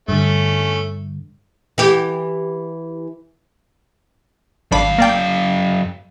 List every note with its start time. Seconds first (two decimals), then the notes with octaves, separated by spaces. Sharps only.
0.08 G2 D3 A3 C#4
1.78 E3 G4
4.71 G#1 F#2 D4 F5 B5
4.98 A#3 D5 G5